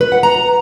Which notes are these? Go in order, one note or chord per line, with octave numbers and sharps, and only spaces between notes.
B4
F#5
A#5